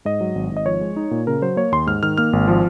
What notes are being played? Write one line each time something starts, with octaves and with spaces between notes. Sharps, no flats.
G#2 D#5
F#3
G#1
G#1
D#5
F3 C#5
G#3
D#4
A#2
C#3 A#4
F#3 C5
A#3 C#5
D#2 C6
G#2 F6
D#3 F6
A#3 F6
G#1
F3